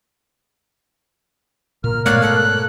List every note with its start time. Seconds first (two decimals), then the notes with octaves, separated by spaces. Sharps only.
1.84 A#2 A#4 F6
2.06 G#2 B2 A3 C#5 D5 F5 F#6
2.22 A4 F#6